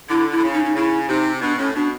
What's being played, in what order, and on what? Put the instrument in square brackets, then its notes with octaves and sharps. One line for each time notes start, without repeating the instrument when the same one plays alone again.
[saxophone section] D3 [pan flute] E4
[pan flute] E4
[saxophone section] D3
C#3
[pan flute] D#4
D#4
[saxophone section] C#3 [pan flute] E4
[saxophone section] C3 [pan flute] D#4
[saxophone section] B2 [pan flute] D4
[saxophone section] A2 [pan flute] C#4
[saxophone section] B2 [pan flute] D4